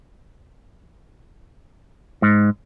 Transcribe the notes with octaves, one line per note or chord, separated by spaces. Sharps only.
G#2